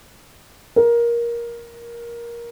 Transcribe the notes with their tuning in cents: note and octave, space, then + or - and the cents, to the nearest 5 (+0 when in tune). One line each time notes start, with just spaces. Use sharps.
A#4 +15